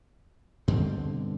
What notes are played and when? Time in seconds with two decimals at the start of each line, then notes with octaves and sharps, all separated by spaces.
0.68 G2 B2 D3 C4